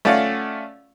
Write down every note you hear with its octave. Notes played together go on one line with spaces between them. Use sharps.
A3 C#4 F4 D5 F5 F#5